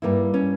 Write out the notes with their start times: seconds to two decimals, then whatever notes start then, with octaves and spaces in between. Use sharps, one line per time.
0.02 G2 G3 A#3 E4
0.34 C#4